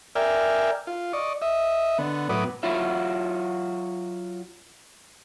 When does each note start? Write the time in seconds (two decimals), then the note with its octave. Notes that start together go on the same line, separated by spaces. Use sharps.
0.15 A#4 D5 E5 G5 G#5 F6
0.87 F4
1.13 D5 D#5 C#6
1.42 D#5 E5
1.98 D3 B3
2.29 A2 F#3 B3 B4 D6 D#6
2.63 F#3 F4 F#4 E5